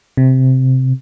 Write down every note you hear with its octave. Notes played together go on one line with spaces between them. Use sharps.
C3